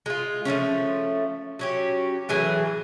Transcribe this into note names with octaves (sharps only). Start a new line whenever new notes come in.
G#3 F4
F3 G3 A3 C#4
F#3 C#4 G4
A2 E3 F#3 G#4